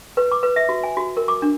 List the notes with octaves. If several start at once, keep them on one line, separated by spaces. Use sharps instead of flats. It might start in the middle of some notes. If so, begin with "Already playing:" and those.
B4
D6
B4
E5
F#4
G#5
F#4
A#4
D6
D4